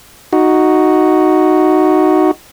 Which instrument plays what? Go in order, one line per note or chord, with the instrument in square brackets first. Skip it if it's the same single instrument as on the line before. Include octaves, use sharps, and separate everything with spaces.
[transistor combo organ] D#4 F#4